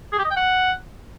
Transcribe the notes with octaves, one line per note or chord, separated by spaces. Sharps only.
G#4
G4
D#5
G5
F#5